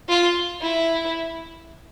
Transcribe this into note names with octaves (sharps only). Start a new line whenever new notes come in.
F4
E4